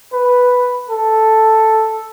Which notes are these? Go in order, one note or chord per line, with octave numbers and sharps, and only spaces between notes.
B4
A4